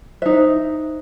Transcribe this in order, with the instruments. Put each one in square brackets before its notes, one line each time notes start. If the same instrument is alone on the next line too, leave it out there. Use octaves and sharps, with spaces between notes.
[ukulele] D#4 E5 [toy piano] C5